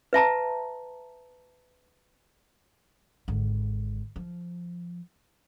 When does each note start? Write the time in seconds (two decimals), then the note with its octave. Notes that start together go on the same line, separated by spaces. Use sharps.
0.13 B4 E5 A5 A#5
3.28 G#1 D3
4.16 F3